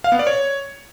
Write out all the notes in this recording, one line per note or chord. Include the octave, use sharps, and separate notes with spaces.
F5
B3
D5
C#5